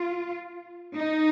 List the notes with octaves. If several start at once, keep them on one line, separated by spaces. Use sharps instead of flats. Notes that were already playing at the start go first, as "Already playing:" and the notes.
Already playing: F4
D#4